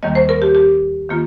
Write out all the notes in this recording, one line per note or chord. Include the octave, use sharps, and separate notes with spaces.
D#2 D#3 G3 A#3 D#5
C5
A#4
G4
G4
D#3 A#3 F4